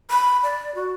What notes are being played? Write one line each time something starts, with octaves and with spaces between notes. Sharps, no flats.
B5
D5
F#4